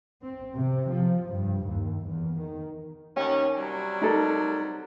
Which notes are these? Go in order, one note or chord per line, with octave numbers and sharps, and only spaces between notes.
C4
C3
F3
G2
D#2
E2
D#3
D#2 C#4 G5
C3 F#3 G3
D#4 A4 A#4